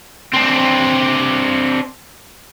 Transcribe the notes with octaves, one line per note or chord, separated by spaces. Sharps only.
C4 D4